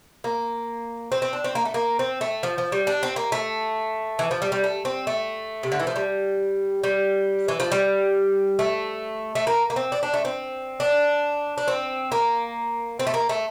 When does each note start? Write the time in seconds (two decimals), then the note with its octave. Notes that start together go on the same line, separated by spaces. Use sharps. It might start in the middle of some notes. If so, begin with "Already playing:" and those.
0.24 A#3
1.12 C4
1.22 C4
1.33 D4
1.44 C4
1.55 A#3
1.65 A3
1.74 A#3
1.99 C4
2.21 A3
2.43 F3
2.58 F3
2.72 G3
2.87 D4
3.03 C4
3.16 A#3
3.32 A3
4.19 E3
4.31 F3
4.42 G3
4.52 G3
4.64 A3
4.85 C4
5.07 A3
5.63 C3
5.72 D3
5.80 E3
5.87 F3
5.96 G3
6.84 G3
7.48 E3
7.60 F3
7.72 G3
8.59 A3
9.35 A3
9.47 A#3
9.70 A#3
9.76 C4
9.92 D4
10.03 D4
10.14 A3
10.25 C4
10.80 D4
11.58 D4
11.68 C4
12.12 A#3
12.99 C4
13.07 A3
13.14 A#3
13.29 A3